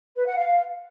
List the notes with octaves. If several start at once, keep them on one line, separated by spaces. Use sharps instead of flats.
B4
F#5
F5